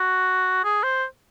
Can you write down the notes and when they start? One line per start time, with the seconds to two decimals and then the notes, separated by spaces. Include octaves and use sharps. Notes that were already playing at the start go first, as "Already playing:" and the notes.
Already playing: F#4
0.64 G#4
0.83 C5